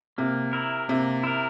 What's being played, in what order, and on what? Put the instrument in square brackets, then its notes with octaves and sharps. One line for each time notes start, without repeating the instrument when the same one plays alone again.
[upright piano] C3 [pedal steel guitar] A#3
[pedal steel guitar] E4 A#4
[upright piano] C3 [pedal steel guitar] A#3
[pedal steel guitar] E4 A#4